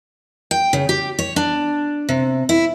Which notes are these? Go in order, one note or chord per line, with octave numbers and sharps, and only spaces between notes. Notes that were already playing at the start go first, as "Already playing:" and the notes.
G5
C#3
G4
C#5
D4
C3
E4